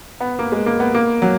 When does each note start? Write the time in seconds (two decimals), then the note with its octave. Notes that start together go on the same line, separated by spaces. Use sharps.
0.21 B3
0.39 A#3
0.52 G#3
0.66 A#3
0.80 B3
0.94 A#3
1.22 F#3